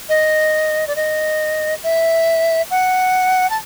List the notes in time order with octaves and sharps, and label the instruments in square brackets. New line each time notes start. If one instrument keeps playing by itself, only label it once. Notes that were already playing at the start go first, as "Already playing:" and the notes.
[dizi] D#5
D5
D#5
E5
F#5
A5